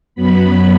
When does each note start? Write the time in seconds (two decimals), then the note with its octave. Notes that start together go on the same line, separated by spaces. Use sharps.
0.15 F#2 F#3 B3 B5